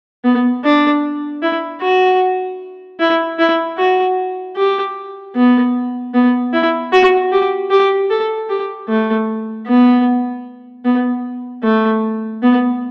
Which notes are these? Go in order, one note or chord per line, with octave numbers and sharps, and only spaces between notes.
B3
D4
E4
F#4
E4
E4
F#4
G4
B3
B3
E4
F#4
G4
G4
A4
G4
A3
B3
B3
A3
B3